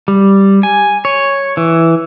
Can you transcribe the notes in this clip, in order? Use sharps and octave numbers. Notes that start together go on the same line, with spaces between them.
G3
G#5
C#5
E3